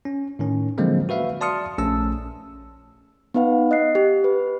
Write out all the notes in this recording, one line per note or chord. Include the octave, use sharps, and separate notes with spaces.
C#4
A2 D#3 C#4
D3 F3 F#3 G#3 A#3 C4
F#4 B4 E5 F5
D5 A5 C6 D#6 F6 C#7
A#1 A3 C#4 A5 E6
B3 D#4 B4 F5 F#5
D#5 F#6 C7
G4
B4